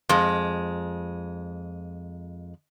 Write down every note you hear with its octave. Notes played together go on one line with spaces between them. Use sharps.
F2 G#3